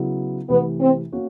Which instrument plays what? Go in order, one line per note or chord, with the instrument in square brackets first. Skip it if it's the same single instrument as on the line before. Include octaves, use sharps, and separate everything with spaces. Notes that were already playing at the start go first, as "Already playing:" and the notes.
Already playing: [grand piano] C#3 F#3 B3 E4
[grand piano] C3 E3 A3 [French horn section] B3
[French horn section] C4
[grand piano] A#3 C#4 F#4